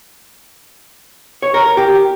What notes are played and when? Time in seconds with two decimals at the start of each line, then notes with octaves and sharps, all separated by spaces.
1.42 C#5
1.54 A#4
1.66 A#4
1.77 G4